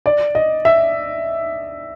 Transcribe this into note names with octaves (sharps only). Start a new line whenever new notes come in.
D5
D#5
E5